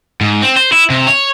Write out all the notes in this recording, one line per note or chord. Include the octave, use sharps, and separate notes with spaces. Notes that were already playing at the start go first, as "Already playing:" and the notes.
G#2
C4
C5
E4
C3
C#5